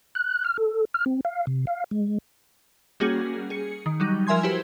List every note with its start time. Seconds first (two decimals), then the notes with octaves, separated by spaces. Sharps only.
0.15 F#6
0.44 F6
0.58 A4
0.94 F6
1.06 C4
1.25 F5
1.47 C3
1.67 F5
1.91 G#3
3.00 G3 A#3 C#4 F#4 G#4
3.50 G#4 C#7
3.86 D#3
4.00 F#3 G3 D#4
4.27 F3 A#4 E5 G#5 C6 G#6
4.43 E4 F#4 G4 B4 C5